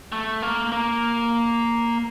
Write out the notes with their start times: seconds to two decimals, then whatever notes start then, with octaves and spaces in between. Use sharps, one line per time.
0.12 A3
0.42 A#3
0.72 A#3